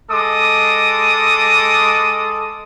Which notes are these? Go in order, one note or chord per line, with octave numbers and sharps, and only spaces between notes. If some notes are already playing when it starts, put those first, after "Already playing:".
G#3 A4 D6 D#6